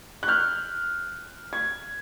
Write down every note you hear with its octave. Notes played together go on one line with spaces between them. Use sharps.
F#6
F6 G6
G#6